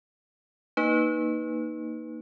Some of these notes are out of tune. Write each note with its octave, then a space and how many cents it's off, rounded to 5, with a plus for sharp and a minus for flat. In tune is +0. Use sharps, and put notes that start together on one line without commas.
A#3 +0 D#4 +0 B4 +0